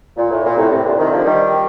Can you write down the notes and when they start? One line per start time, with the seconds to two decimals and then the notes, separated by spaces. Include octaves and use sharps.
0.17 A#2
0.30 A2
0.45 A#2
0.57 A2 C3
0.71 A2 C3
0.84 A#2 D3
0.98 C3 D#3
1.11 D3 F3
1.25 D#3 G3